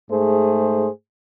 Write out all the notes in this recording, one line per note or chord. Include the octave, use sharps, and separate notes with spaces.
G#2 A3 G#4 C5